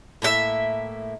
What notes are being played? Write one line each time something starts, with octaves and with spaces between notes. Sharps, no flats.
A2 A#3 D#4 E5